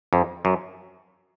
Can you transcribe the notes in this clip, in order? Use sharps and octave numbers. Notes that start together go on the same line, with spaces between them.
F2
F#2